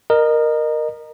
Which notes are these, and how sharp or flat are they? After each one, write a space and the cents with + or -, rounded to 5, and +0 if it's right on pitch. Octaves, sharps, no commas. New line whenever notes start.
A#4 +0 D#5 -25